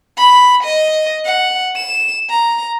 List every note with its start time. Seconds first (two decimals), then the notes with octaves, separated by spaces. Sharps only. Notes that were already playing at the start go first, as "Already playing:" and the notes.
0.17 B5
0.63 D#5
1.25 F#5
1.76 E7
2.29 A#5